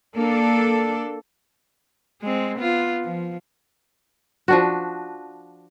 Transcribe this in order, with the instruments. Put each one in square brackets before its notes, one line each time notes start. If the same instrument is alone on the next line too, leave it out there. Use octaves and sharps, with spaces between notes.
[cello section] A#3 D4 A4
[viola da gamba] G#3 C4
B3 F4
F3
[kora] F3 D4 F#4